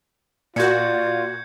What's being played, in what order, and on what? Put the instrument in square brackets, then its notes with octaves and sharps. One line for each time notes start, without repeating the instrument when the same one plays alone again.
[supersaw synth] A#2 F#4 [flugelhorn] F4 [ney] D5 [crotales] G6 G#6 C#7